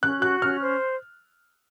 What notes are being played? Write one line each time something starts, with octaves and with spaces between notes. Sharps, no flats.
C#4 F#6
F#4 F#6
C#4 F6
C5